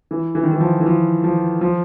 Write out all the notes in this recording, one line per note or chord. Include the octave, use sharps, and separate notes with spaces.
E3
E3
D#3
E3
F3
E3
F3
F3
F3